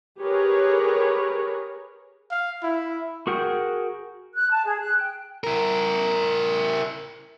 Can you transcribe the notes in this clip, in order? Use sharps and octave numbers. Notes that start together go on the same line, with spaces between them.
G4 G#4 A#4 B4 C#5
F5
E4
F#4 G#4 A#4 F#5 G5
F#6
A5
G#4
F#6
G5
E4 A#4